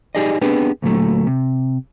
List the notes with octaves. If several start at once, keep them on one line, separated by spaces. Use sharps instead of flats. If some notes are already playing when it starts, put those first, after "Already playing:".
D#4 G4 G#4 D5 D#5
B3 C4 D4 G4 G#4 B4
D2 A#2 F3 F#3 A3
C3